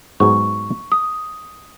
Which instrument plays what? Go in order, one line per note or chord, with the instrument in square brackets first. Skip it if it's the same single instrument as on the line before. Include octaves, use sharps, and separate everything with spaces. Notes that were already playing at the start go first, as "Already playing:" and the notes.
[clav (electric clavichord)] G#2 F#3 B3 D#4 G#4 [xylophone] C#6
[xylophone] D#6